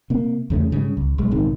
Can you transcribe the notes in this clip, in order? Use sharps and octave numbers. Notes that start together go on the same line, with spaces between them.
C3 A#3
E2 C#3 A3
G#2 C#3 G3
C#2
B1 G#3
A#1 G#2 C3 D#3